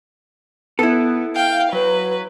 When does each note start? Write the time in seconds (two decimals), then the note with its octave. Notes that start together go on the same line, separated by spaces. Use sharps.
0.79 B3 E4 A4
1.36 F5 G5
1.73 F#3 B4